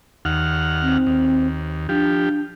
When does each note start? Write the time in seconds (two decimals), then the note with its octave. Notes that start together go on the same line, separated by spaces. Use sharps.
0.25 D#2 F#5 F6
0.82 C4
1.07 D#2
1.89 F3 D4 G4